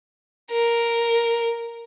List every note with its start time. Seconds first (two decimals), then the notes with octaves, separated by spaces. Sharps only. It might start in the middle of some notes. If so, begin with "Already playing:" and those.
0.51 A#4